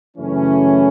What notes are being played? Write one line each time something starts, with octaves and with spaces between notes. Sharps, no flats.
F#2 C#3 E3 A3 C#4